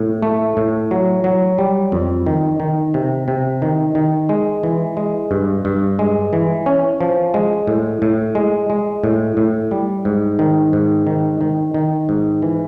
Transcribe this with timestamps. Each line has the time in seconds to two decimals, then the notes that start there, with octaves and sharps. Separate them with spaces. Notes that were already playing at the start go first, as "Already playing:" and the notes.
Already playing: A2
0.23 A3
0.57 A2
0.91 F#3
1.24 F#3
1.58 G3
1.92 F2
2.26 D#3
2.60 D#3
2.94 C3
3.28 C3
3.62 D#3
3.95 D#3
4.29 G#3
4.63 E3
4.97 G#3
5.31 G2
5.65 G2
5.99 G#3
6.33 E3
6.66 C#4
7.01 F3
7.34 G#3
7.67 A2
8.02 A2
8.35 G#3
8.70 G#3
9.04 A2
9.37 A2
9.71 G3
10.05 G#2
10.39 D#3
10.73 G#2
11.07 D#3
11.41 D#3
11.74 D#3
12.09 G#2
12.42 E3